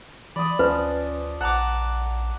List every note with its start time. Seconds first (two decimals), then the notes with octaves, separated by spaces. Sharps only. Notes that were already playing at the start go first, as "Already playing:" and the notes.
0.36 E3 D5 B5 D#6
0.59 D2 F3 C#4 B4
1.41 A#1 F#5 A5 A#5 D6